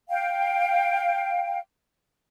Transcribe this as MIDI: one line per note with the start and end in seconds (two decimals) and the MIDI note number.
0.09 1.59 77
0.09 1.59 79